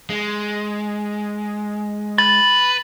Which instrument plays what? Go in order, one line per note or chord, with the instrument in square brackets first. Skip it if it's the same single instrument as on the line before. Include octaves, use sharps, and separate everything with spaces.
[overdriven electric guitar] G#3
[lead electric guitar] B4 [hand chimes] A6